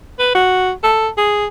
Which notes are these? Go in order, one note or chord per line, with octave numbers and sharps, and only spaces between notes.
B4
F#4
A4
G#4